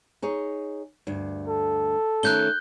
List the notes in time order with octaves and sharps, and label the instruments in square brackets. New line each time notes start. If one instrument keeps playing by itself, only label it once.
[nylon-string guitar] D#4 G#4 C#5
D2 G2
[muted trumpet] A4
[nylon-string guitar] D#3 A3 C#4 [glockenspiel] F#6 G6 G7